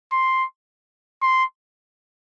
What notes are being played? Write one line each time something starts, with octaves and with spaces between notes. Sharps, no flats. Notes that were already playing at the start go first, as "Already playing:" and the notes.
C6
C6